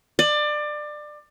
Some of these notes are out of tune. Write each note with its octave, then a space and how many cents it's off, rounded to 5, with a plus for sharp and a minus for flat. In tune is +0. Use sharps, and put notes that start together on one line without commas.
D5 +25